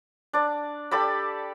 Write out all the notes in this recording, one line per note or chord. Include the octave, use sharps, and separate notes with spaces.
D4 D5
G4 A4 D5 B5